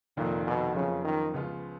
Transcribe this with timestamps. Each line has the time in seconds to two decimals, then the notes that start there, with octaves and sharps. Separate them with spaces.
0.17 F1 F2 A#2 D#3
0.47 B2
0.75 F#1 F2 C#3 F3 B3 F4
1.04 D#3
1.34 C#2 C#3 F3 B3 F4